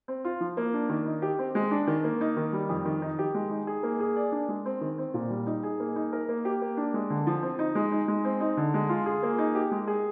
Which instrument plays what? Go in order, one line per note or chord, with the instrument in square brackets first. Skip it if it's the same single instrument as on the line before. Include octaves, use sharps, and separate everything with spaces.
[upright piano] C4
F4
F3
A#3
D4
D#3
D#4
G4
C4
G#3
D4
D#3
A#3
D#4
D#3
G3
F2
D#3
D#4
G4
G#3
D#4
G#4
A#3
G#4
D5
D4
G#3
C4
D#3
C4
A#2
G3
D#4
G#4
A#3
D#4
A#4
A#3
G4
A#3
D4
G#3
D3
F3
C4
D#4
G#3
D#4
G#3
C4
D#4
D3
G#3
F4
G#4
A#3
D#4
G4
G#3
G#4